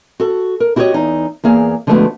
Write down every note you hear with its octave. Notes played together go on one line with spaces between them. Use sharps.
F#4 A4
A#4
E4 F#4 G4 C5 C#5 D#5
E2 D#4
E2 A#3 G#4 F5
D3 F3 G#3 A3 B3 F#4